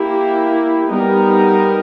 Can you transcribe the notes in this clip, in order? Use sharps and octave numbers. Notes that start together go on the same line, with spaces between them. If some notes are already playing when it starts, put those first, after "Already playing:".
Already playing: A#3 E4 G4
G3 B3 D#4 A#4